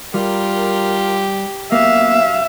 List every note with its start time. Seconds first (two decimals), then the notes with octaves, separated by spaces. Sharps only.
0.14 G3 F4 G4 A#4
1.72 F#2 A#3 B3 E5 F5